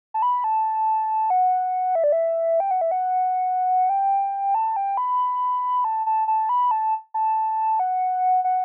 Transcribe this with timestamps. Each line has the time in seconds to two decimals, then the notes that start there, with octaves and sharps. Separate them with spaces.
0.14 A5
0.22 B5
0.44 A5
1.30 F#5
1.95 E5
2.04 D5
2.12 E5
2.60 G5
2.71 F#5
2.81 E5
2.91 F#5
3.90 G5
4.55 A5
4.76 G5
4.97 B5
5.84 A5
6.06 A5
6.28 A5
6.49 B5
6.71 A5
7.14 A5
7.79 F#5
8.44 F#5